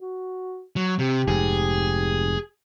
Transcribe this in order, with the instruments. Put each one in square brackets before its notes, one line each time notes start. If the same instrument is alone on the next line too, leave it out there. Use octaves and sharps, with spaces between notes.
[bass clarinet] F#4
[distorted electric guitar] F#3
[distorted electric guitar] C3 [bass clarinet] G4
[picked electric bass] F1 G#2 [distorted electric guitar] G#4